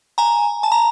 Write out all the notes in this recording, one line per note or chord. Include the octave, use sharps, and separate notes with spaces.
G#5 A#5
A5
A#5